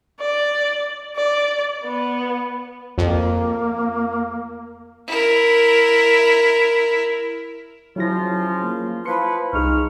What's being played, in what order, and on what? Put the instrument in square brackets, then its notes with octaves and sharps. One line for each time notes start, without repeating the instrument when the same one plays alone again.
[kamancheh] D5
D5
B3
[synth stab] F2 [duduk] A#3
[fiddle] E4 A#4
[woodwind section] C#3 F3 F4 [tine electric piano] F#3 E4 A#6
[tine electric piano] A#3
[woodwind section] F3 E4 B4 [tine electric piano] C6 C#7
[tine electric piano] C2 D#4 G#4 [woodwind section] C#6 F6